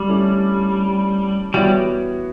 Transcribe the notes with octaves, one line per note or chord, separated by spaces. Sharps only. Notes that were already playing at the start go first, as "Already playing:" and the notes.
Already playing: G3
D3 A3 C#4 E4
E3 G3 B3 F#4 C#5